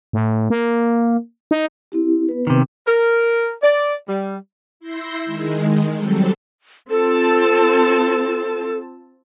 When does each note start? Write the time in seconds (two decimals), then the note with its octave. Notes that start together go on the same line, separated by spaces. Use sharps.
0.13 A2
0.50 A#3
1.51 D#4
1.92 C4 E4 G4
2.29 B3 B4
2.47 C3 D#3
2.87 A#4
3.62 D5
4.08 G3
4.80 E4 C6 E6 G6 A#6 C7
5.25 D#3 G#3
5.96 F#3 G3 C4 A4
6.90 C4 F4 A4 A5